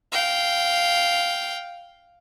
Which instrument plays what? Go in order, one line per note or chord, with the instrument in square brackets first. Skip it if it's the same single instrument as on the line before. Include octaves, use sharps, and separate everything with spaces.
[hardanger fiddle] F5 G5